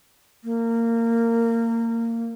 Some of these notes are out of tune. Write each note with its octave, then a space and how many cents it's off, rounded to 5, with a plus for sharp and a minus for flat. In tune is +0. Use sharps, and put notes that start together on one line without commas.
A#3 -20